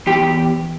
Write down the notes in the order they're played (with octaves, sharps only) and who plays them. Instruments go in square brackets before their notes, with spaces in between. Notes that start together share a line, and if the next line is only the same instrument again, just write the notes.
[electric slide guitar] E2 G4